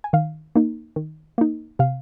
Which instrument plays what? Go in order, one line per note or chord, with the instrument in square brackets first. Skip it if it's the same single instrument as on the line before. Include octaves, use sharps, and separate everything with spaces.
[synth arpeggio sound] G#5
D#3 F5
A#3 D#4
D#3
A#3 D#4
C3 F5